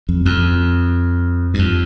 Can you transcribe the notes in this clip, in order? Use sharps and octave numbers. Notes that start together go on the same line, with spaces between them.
F2
F2
G2
F2